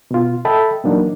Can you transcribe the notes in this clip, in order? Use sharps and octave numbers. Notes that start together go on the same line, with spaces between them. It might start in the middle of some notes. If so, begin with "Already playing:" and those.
B2 F4
A4 D#5 E5 G5 A5 B5
A#2 E3 F#3 A#3 D4 D#4